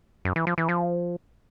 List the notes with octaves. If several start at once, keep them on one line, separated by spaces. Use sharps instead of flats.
F#2
E3
F3
E3
F3